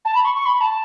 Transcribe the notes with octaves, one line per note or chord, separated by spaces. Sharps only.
A5
B5
C#6
C#6
B5
A5